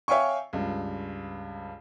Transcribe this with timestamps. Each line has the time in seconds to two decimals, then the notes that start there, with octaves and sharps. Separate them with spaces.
0.08 C#5 E5 F5 G5 G#5 C#6
0.53 C#2 G2